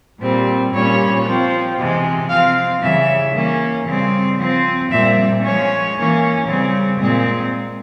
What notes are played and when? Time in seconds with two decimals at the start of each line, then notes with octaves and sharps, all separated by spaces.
0.21 A#2 G3 C4
0.74 A#2 G3 C#4 C#5
1.26 F3 C4
1.79 C3 E3 G#3
2.30 F3 C4 F5
2.82 C#3 E3 G3 E5
3.36 E3 A#3 C#4
3.87 C#3 G3 C4
4.40 F3 C4
4.91 A#2 G3 C4 E5
5.44 F3 G#3 C#4 C#5
5.96 E3 A#3 C#4
6.48 C#3 G3 C4
7.01 A#2 G#3 C4